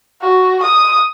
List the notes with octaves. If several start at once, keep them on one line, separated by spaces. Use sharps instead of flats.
F#4
D#6